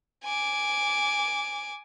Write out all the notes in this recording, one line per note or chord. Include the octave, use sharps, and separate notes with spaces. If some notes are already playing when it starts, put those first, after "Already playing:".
G#5 D6